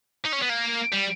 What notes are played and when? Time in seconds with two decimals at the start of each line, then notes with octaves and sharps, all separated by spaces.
0.25 D#4
0.32 C#4
0.42 B3
0.49 A#3
0.92 G3